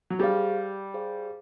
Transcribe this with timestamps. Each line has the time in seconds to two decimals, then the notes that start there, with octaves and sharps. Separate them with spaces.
0.10 F#3
0.19 G3 G#4 C5 F5
0.94 G#4 C5 F5